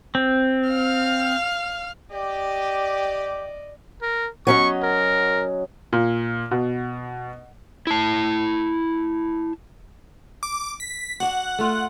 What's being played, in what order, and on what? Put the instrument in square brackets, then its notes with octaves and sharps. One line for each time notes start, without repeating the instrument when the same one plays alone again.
[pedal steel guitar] C4
[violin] F5 F6
[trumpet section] G4 [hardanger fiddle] D5 D#5
[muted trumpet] A#4
[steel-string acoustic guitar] F#3 C#4 D#5 [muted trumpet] C#6
[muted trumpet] A#4
[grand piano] A#2
B2
[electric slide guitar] E4 A5
[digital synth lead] D6
B6
[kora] D4 F#4 [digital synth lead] F#5
[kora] A3 F4